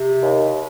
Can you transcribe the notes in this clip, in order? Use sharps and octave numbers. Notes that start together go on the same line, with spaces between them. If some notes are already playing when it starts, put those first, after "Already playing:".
Already playing: C3
D#2